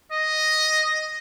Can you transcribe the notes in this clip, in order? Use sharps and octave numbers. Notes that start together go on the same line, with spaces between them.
D#5